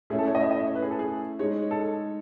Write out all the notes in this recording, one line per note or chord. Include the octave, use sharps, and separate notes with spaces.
A3 C#4 E4 G#4
A4
C#5
D#5
E5
D#5
E5
C#5
B4
G#4
A4
G#4
G#3 D#4 G#4 C#5
A4